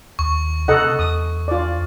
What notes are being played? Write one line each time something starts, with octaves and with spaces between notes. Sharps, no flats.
D#2 C#6
C3 A4 D#5 F#5
E2 D#6
F4 D5